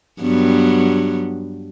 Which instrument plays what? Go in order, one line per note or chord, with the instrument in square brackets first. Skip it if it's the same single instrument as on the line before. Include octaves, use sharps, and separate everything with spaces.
[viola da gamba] G2 F#3 B3